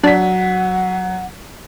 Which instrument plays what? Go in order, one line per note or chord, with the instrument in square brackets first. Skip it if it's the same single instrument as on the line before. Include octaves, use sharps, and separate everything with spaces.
[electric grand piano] F#3 B6 [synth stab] D4 [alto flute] F#5